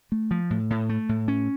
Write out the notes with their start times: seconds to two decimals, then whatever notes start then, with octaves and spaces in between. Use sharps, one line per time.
0.12 A3
0.31 F3
0.50 A2
0.70 A2
0.89 A3
1.09 A2
1.28 C#4